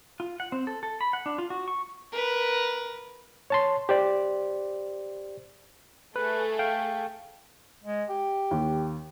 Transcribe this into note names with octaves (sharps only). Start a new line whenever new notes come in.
F4
F#5
C4
A4
A4
B5
F#5
D4
F4
F#4
C#6
A#4 B4
C#5 A5 C6
G4 C5 D5
A3 G#4 B4
F5 G5
G#3
G4
D#2